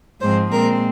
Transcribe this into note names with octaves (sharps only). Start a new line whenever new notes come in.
G#2 F3 G#3 C4 C5
A#2 G#3 C4 A#4